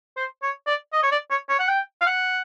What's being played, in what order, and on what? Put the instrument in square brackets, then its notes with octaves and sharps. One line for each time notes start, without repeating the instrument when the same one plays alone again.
[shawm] C5
C#5
D5
D#5
C#5
D5
C#5
C#5
F#5
G5
F5
F#5